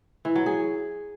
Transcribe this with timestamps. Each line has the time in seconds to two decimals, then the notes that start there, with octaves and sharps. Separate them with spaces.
0.25 E3
0.36 F#3
0.46 G#4